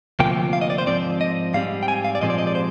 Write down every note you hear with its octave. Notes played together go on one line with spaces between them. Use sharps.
D2 C3 F3 A#3 G5
F5
D#5
D5
C5
G#2 F3 C4 D5
D#5
G#2 G3 C4 F5
G5
G#5
F5
D5
A#2 F3 G#3 C4 D#5
D5
D#5
D5
C5